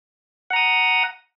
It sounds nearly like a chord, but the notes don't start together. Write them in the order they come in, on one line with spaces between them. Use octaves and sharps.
F#5 A#5 D#6